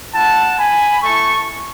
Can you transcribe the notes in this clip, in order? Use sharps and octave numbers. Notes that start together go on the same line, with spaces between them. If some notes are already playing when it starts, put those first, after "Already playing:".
A3 E4 F#5 A5
G#5 B5
A3 E4 A5 C#6